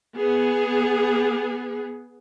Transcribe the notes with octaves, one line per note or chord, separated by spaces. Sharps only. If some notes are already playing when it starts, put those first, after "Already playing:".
B3 G#4